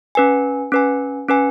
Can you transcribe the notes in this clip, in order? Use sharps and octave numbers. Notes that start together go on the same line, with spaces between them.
C#4 B4 G#5
C#4 B4 G#5
C#4 B4 G#5